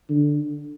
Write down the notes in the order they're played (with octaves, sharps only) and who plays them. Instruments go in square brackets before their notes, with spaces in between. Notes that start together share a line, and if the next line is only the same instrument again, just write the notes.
[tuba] D3